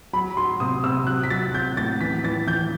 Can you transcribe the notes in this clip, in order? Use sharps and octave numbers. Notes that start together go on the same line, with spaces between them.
F#3 B5
F#3 C6
C3 D#6
C3 E6
F#3 F#6
B6
F#3 A6
F#3 G6
A2 A6
E3 B6
E3 A6
E3 G6